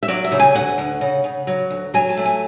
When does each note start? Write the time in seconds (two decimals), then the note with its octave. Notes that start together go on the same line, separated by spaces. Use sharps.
0.03 E5
0.08 F#3 D5
0.24 E5
0.32 C#3
0.39 G#5
0.55 D2 F#5
0.78 D2
1.01 C#3
1.24 C#3
1.47 F#3
1.70 D2
1.94 F#3 G#5
2.10 A5
2.17 A3
2.25 G#5